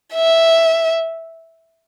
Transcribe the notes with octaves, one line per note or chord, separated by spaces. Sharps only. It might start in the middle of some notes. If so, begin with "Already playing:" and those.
E5